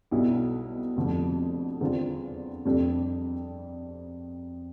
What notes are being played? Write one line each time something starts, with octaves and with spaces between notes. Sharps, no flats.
B1 B2 G3 B3 E4
F1 F2 D3 F3
E2 D3 G3 C4 F4
F2 C3 G3 D4 A4